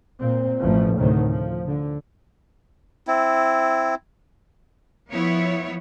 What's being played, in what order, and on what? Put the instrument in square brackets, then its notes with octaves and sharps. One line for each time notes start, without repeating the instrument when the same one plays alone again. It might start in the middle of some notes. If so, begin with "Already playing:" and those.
[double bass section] A#2 C4
A1 B2 F3 A3
D2 A2 C3 D#3 F#3
F3
D3
[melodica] C4 E4
[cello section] F3 B3 E4 C#5